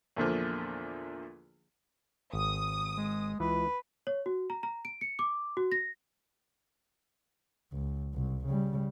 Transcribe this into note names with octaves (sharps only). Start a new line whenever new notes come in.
E2 A#2 D3 F3
G#1 D#6
G#3
C#2 E3 B4
C#5
F#4
A#5
A#5
D7
C#7
D6
F#4
A#6
C#2
C2
C#3 G3